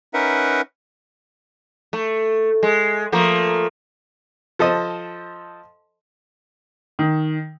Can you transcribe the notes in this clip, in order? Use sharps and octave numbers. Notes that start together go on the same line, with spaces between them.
C#4 D#4 A#4 B4 E5 F#5
A3
G#3
F3 A3 A#3
F3 A4 C5 D#5
D#3